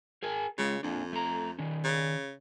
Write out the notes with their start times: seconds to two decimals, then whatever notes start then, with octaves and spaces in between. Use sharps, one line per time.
0.23 G#4 A#4 G#5
0.58 C#3 G#3 F4
0.83 F2 A#3 D4
1.13 A3 A#5
1.59 D#3 C#4
1.84 C#3